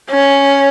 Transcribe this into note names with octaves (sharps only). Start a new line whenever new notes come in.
C#4